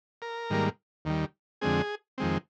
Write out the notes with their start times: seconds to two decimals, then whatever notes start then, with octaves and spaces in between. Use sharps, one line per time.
0.22 A#4
0.50 G#2 D#3 G3 A#3
1.05 D#2 D#3 G3
1.61 F2 D3 G#3 C4 G#4
2.18 F2 D#3 G#3 C4